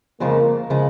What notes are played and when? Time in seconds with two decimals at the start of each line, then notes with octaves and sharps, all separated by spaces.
0.20 F2 C#3 F3 G#3 A#3
0.70 C#3 F3 G#3